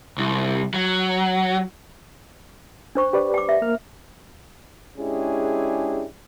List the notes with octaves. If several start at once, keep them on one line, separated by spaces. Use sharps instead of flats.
C2
F#3
D4 C5 C#6
G4 B4 D5
G5 D6
E5
A#3 A#4 F6
G#3 C#4 D4 E4 G4 G#4